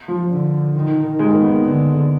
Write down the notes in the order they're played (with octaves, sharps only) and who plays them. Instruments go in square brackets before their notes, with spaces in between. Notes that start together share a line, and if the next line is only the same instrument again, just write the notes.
[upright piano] F3
[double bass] D3
D#3
[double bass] D#3 [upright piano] G#3
[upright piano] A#3
B3
[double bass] D3